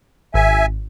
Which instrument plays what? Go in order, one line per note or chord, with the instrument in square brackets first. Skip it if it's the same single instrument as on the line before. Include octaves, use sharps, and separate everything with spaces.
[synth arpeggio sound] G#1 [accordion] E5 G#5